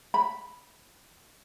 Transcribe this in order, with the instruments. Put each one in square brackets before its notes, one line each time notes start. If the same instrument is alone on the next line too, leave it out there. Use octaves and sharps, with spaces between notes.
[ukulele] B5